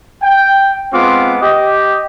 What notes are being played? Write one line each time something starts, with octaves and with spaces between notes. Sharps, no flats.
G5
G#3 B3 C4 F4 D6
G4 D#5